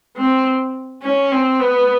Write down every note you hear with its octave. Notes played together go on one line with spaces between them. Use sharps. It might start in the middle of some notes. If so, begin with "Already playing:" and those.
C4
C#4
C4
B3